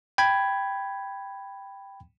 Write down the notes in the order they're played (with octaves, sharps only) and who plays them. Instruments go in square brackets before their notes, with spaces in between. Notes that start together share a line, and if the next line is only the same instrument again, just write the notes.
[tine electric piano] G5 B5 G#6